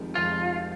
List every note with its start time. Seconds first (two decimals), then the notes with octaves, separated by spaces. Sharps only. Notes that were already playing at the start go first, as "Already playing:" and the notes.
Already playing: F1 F2 D#3 G#3
0.15 F1 F2 D#3 G#3 F4